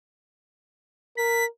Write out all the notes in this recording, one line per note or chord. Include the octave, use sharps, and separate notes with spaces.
A#4 B6